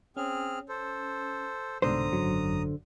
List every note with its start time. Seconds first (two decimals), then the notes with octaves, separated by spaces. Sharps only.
0.17 C4 C#4 G#4 F6
0.69 A4 C5
1.82 C2 G#2 B2 D3 C5 A#5 D#6
2.13 G#1 F#2 F#3